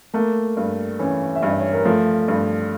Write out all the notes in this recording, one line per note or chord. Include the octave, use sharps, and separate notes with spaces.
A3 A#3 A#4
G2
E3 C#4 C#5
E5
G2 D5
C#5
A#4
F3 A3 A4
G2